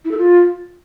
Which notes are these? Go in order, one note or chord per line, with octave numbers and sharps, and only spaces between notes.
E4
A4
F4